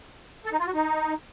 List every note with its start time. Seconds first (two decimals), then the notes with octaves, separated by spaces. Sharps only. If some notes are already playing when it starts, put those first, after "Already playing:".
0.45 A4
0.52 D#4
0.60 F4
0.67 F#4
0.74 D#4